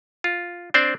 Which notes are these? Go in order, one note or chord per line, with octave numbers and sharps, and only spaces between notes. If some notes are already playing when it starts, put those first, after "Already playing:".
F4
C4 D4 C5 D5